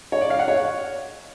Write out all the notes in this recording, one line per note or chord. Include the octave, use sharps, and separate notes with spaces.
C#5
D5
F5
F#5
C#5